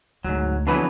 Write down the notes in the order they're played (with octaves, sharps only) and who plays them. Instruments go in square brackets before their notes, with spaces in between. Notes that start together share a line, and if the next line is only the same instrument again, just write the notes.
[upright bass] D2 [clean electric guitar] G#2 F#3
[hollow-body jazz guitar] F2 E3 B4 [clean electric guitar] D3 F#3 B3